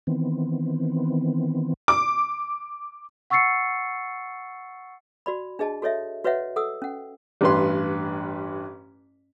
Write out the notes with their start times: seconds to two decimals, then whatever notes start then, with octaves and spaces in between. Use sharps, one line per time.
0.07 D#3 E3 B3 C4
1.88 D6
3.30 F#5 C#6 E6 A6 C7 C#7
5.26 F#4 D5 B5
5.59 D4 G#4 D#5 A5
5.82 F#4 A4 C#5 D#5 E5
6.24 F#4 B4 C#5 D#5 E5 F#5
6.56 A4 F#5 D#6 E6
6.82 C#4 F#5
7.41 A1 G2 B4 C6